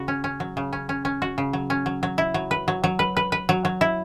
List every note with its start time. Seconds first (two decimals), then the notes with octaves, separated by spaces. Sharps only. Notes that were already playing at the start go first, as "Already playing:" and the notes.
Already playing: C#3 F#4
0.08 C#4
0.24 C#4
0.40 F#3
0.57 C#3
0.73 C#4
0.89 C#4
1.05 C#4
1.22 F#4
1.38 C#3
1.53 F#3
1.70 C#4
1.86 F#3
2.03 F#3
2.18 E4
2.34 F#3
2.51 B4
2.68 F#3
2.84 F#3
2.99 B4
3.17 B4
3.32 B4
3.49 F#3
3.65 F#3
3.81 E4